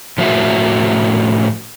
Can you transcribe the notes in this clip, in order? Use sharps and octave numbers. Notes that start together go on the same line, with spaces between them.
A2 F3 C#4 F#4 E5